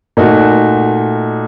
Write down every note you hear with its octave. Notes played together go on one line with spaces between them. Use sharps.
A#2 A3 D#4 F#4